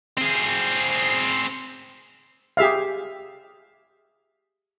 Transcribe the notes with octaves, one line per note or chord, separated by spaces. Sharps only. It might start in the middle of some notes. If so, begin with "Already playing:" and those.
C4 G#4
G4 G#4 E5 F5